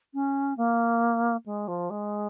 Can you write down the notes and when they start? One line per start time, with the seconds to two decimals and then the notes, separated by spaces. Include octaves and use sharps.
0.14 C#4
0.57 A#3
1.46 G#3
1.68 F3
1.90 G#3